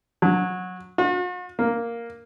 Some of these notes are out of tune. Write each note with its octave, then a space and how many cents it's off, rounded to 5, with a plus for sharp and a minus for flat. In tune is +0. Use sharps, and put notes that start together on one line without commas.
F#3 -15
F#4 -45
A#3 +0